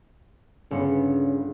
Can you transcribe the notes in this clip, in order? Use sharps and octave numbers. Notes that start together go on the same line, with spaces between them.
G1 C#3 B3 C#7